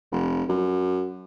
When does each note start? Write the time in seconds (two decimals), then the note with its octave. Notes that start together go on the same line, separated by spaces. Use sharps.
0.12 F1
0.49 F#2